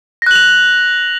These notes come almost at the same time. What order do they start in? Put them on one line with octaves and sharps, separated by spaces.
A#6 F#6 F#7 F7